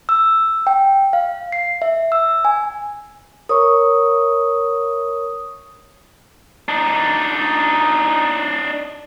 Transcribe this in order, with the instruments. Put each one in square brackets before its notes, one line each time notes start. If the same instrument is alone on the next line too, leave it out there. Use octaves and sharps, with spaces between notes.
[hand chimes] E6
G5
F5
C7
E5
E6
G#5
[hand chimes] A#4 C#5 C#6 [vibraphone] D#6
[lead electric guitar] D4 D#4